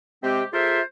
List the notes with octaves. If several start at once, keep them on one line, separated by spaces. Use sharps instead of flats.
C3 G#3 C4 G4
A3 F4 G#4 A#4 C5 E5